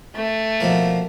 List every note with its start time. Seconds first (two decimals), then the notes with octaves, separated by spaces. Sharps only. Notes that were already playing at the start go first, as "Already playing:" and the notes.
0.15 A3
0.60 B2 F3 A#3